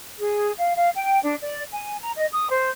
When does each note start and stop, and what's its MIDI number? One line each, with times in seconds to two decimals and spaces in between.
0.19 0.52 68
0.58 0.74 77
0.77 0.90 77
0.96 1.19 79
1.23 1.35 62
1.42 1.63 74
1.72 1.97 80
2.01 2.11 82
2.16 2.26 75
2.31 2.48 87
2.50 2.70 72